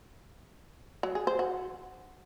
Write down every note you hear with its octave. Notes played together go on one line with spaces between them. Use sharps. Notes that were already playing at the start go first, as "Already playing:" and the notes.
F#3
G#4
C5
F#4